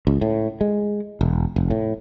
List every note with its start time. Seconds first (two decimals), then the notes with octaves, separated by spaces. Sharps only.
0.07 C#2
0.21 A2
0.61 G#3
1.21 E1
1.56 F1
1.70 A2